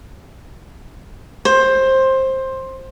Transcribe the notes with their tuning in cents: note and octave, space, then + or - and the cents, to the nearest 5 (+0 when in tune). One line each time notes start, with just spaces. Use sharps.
C5 +15